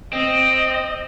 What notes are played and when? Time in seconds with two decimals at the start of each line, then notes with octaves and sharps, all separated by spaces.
0.13 C4 D#5